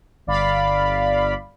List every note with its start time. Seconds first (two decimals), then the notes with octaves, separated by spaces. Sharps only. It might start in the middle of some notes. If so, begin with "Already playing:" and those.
0.27 G1 D5 F5 B5